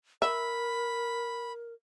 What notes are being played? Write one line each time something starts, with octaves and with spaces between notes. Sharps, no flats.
A#4 E5 B5